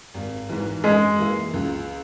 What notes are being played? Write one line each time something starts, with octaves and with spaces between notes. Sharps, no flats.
G#1
G#2 E3
F#2 G#3
E3 A#3 E4
C#2